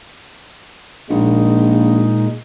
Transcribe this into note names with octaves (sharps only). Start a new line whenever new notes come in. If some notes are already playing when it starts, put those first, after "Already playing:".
A#1 A#2 G#3 D#4